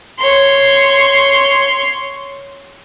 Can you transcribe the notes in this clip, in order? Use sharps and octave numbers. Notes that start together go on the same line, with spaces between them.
C#5 C6